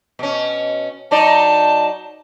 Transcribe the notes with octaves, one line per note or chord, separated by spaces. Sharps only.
B2 C#4
F#3 D#4 D5 A5